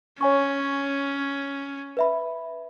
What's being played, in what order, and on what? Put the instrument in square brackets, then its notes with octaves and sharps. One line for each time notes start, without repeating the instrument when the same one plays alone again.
[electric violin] C#4 [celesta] C#5 G#5 C#6
[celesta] B4 E5 B5